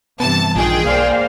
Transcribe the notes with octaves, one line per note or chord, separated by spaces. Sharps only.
G2 C3 E3 B3 A5
A#1 D#3 D4 F4 G#4 G5
B1 A#3 C5 D5 F5